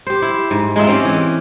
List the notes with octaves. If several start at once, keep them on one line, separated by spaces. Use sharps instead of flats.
G4 C5
E4
G#2
G#3 D#4 F4 E5
C4 C#4 G4
E3